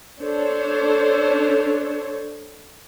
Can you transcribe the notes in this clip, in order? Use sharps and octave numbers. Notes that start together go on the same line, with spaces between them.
D4 A4 C5 C#5